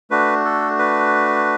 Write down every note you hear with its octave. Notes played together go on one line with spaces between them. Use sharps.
A3 D4 F#4 B4
A4
B4